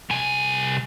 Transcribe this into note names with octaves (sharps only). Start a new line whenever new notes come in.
C2 G#5